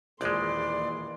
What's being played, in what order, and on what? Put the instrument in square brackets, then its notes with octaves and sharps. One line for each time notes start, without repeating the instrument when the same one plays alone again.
[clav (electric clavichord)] A#1 G#3 [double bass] D#2 E3 [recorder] D5 [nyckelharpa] C6